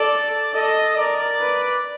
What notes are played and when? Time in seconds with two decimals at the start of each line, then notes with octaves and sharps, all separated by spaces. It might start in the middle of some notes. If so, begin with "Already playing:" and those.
Already playing: A4 D5
0.54 A4 D#5
0.97 A#4 D5
1.40 B4